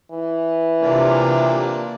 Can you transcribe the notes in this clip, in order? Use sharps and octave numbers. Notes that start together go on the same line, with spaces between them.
E3
C3 A#3 D4 F4